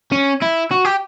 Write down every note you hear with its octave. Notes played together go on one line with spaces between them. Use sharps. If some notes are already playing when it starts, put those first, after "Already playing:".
C#4
E4
F#4
G4